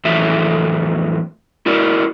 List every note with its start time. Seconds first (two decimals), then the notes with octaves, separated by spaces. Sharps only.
0.05 F2 A2 E3 F#3 A4 E5
1.66 E4 F#4 A#4 D5